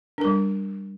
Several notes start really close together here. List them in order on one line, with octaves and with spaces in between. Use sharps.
D4 A#4 G3